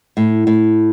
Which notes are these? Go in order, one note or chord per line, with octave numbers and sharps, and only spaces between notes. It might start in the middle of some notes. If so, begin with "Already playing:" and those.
A2
A2